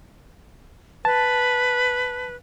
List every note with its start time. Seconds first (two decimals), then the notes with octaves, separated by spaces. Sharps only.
1.05 B4 A5